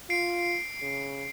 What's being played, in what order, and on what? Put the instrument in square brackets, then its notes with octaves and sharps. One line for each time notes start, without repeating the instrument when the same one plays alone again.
[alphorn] F4 [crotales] C7 D7
[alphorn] C#3